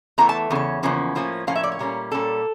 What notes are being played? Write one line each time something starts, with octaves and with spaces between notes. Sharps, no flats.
E2 E3 A3 A#5
A5
E2 C#3 C#4
E2 C#3 F3 A#3 C#4
A2 F3 A#3 C#4
A2 F3 A#3 C#4 F5
E5
D5
C#5
A#2 G3 A#3 C#4
A#2 G3 A#3 C#4 A4